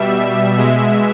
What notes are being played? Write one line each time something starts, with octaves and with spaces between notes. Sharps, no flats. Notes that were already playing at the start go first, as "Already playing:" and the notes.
Already playing: B2 G3 E5
E5
B2 G#3 E5